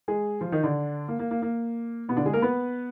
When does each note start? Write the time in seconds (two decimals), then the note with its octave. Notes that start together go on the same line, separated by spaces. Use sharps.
0.08 G#3 G#4
0.41 F3 F4
0.52 D#3 D#4
0.63 D3 D4
1.08 A#3
1.19 A#3
1.31 A#3
1.42 A#3
2.09 B2 B3
2.17 D3 D4
2.26 G#3 G#4
2.33 A#3 A#4
2.42 B3 B4